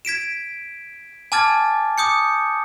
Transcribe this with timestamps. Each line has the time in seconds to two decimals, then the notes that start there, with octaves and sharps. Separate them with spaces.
0.05 G#6 B6 D7 E7
1.32 G#5 A5 D6 F6 G#6 A6
1.98 D6 D#6 G6 C#7